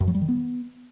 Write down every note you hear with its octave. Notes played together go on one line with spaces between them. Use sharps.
F#2
F#3
G3
D#3
B3